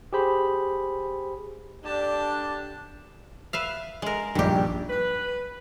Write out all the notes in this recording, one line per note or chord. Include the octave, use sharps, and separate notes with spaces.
G4 G#4 C5 B5
D3 D4 G4 A5
B4 E5 F5
G#3 A#4
A#1 G2 D#3 G4
B4